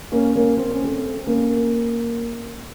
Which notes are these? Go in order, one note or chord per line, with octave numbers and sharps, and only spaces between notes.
A#3 C#4
A#3 C#4
C4
C#4
A3 C4
A#3 C#4